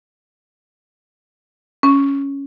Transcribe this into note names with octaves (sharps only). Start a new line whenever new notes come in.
C#4